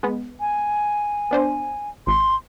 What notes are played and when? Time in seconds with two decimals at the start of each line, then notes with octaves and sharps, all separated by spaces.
0.03 G#3 B3
0.40 G#5
1.31 B3 D4 C5
2.07 G#1 C6